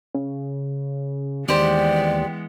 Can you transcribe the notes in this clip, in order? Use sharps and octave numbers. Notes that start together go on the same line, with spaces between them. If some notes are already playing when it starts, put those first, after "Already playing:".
C#3
D#2 E3 G#3 B3 G4 C5 D5